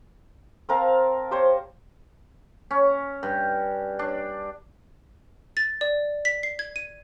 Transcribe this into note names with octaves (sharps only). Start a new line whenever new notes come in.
C4 A#4 F5 A5
G4 C5 C#5
C#4
G2
D4
A6
D5
B6
C7
G#6
D#7